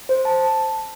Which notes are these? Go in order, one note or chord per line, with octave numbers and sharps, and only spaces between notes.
C5
A5